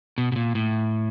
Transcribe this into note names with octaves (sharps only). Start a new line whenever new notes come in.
B2
B2
A#2
A2